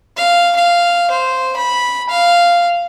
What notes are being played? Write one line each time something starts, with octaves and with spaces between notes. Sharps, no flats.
F5
F5
C5
B5
F5